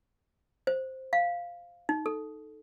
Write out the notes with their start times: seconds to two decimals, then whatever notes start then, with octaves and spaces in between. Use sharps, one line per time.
0.67 C5
1.13 F5
1.89 D#4
2.06 A4